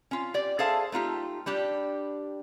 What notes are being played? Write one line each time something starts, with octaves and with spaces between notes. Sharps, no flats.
C#4 F4
G4 D5
G#4 A4 C5 E5 F5 A5
A3 D#4 F4 G4
G3 D4 G4